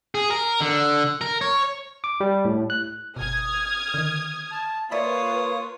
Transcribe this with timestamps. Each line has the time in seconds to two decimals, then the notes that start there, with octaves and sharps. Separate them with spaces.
0.15 G#4
0.30 A#4
0.61 D3
1.21 A#4
1.41 C#5
2.04 D6
2.20 G3
2.45 A2
2.70 F#6
3.16 G1 B2 D#6 F6 G#6
3.94 D3 D#3
4.51 A5
4.91 A#3 F4 B4 C#5 D5 E5 B5 D#6